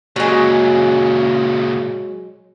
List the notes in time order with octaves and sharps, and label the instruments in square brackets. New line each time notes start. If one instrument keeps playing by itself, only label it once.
[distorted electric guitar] A#2 C#3 [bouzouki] F#3 G#3